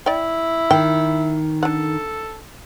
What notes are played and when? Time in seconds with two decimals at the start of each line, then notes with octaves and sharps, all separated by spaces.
0.06 E4 D5 G5
0.71 D#3 G5
1.63 D3 A4 F#5